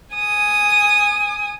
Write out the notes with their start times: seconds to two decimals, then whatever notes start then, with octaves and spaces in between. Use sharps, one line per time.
0.15 G#5 D#6